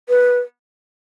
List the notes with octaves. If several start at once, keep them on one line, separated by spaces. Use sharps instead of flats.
B4